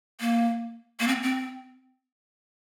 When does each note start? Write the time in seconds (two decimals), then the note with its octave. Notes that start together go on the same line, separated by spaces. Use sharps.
0.20 A#3
1.00 A#3
1.08 C4
1.23 C4